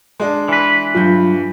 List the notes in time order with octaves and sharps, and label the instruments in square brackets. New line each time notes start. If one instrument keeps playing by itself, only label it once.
[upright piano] G#3 D4
[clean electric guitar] E3 B4
[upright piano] G2 G6 [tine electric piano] F#3 F4